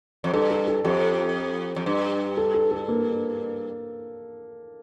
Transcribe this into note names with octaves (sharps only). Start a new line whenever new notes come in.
F2
G2 A4
A4
A4
F2 G4
F2
G2
A4
A4
A4
A#3